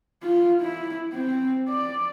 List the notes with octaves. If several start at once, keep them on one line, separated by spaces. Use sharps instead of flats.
F4
E4
C4
D5